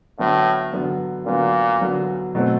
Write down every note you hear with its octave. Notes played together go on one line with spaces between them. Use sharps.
A2 D3 F#3 B3
D3 F#3 B3
A#2 D3 F#3 B3
D3 F#3 B3
B2 F#3 A3 C4